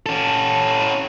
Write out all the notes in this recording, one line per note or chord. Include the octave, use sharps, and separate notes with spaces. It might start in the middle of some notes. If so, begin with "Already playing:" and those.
C#4 A4